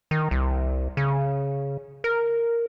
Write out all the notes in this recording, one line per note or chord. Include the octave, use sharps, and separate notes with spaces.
D#3
C2
C#3
A#4